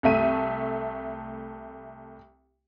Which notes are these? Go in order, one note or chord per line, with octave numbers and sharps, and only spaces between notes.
C2 A3 E5 D#7